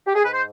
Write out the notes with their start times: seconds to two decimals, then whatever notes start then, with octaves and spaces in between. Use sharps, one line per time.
0.07 G4
0.15 G#4
0.24 G#2 B4
0.33 C5